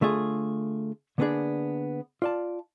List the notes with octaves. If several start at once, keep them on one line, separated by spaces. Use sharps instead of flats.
D3 A3 F4 G#4
D3 A#3 B3 C#4 D4 G#4
F4 D5 A5